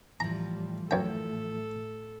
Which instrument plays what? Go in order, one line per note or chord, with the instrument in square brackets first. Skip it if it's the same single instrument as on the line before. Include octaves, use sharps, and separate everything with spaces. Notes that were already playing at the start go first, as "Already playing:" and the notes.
[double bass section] A2 G3 [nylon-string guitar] E3 F3 [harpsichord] A#5
[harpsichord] F#2 G5 [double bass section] A2 A3 [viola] A4